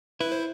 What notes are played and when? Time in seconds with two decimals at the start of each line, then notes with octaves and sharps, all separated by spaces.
0.20 E4 B4
0.32 C5